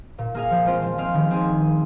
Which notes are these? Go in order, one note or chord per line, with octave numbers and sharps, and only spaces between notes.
A#2
A#3 G#4 F5
F3
G#3 C4 F4 C5
F3
C4 G#4 F5
D#3
C4 G#4